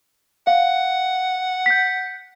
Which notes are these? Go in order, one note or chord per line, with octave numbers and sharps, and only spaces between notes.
F5 F#5
G6 B6